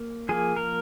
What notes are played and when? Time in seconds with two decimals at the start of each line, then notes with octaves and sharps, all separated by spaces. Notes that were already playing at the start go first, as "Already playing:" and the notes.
Already playing: A#3
0.29 F3 A#3 G#4
0.56 A#4